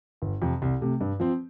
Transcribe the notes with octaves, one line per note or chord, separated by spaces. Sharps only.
G1
F2 C3 F3
C2
C3 A3
G2
F3 C4